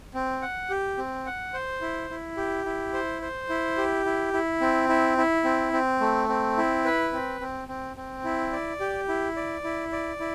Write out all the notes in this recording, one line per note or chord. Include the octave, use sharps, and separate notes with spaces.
C4
F#5
G4
C4
F#5
C5
E4
E4
G4
E4
C5
C5
E4
G4
E4
E4
C4
E4
E4
C4
C4
A3
C4
E4
B4
C4
C4
C4
C4
E4
D5
G4
E4
D5
E4
D5
E4